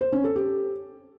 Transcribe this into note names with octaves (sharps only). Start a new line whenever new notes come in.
C5
C#4
A4
G4